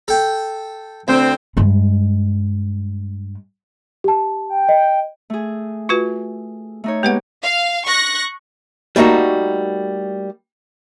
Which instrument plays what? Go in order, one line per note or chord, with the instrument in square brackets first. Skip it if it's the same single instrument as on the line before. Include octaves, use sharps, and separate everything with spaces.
[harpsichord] A4 G5
[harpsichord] D2 [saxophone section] C4
[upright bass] G2 G#3
[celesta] G4 A5
[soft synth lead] G5
[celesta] D#5
[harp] A3 G#4
[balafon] F4 F#4 B4
[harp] A3 D#4 C#5
[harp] G#3 B3 G4 [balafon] A#3 B4 F#5
[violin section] F5
C#6 F#6 A#6
[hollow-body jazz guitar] G3 A3 A#3 D#4 F#4